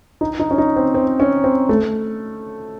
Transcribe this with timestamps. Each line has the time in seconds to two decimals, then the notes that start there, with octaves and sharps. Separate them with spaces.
0.21 D#4
0.39 D#4
0.51 C#4
0.58 D#4
0.76 C4
0.95 C4
1.20 C#4
1.44 C4
1.69 A3